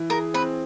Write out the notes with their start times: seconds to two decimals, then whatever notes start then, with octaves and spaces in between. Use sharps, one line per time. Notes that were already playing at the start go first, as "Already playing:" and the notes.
Already playing: E3
0.10 G#4 A#4
0.34 C4 B4